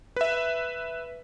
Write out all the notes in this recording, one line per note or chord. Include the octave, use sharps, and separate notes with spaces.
B4 E5